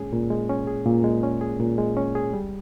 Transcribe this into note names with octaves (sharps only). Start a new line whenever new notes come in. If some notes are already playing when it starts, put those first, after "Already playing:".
Already playing: A#2 G#3 C#4 G#4
A#2
G#3
C#4
G#4
A#2
G#3
C#4
G#4
A#2
G#3
C#4
G#4
G3